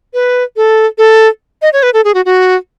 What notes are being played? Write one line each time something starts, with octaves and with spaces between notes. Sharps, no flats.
B4
A4
A4
D#5
C#5
B4
A4
G#4
F#4
F#4